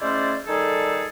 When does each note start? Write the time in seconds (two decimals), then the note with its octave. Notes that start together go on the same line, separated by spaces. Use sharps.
0.01 G#3 A3 C#4 E4 C5 D5
0.47 D#3 G3 D#4 G#4 A4